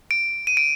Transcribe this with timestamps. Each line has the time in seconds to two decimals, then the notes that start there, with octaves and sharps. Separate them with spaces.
0.11 D7
0.47 D#7
0.57 D7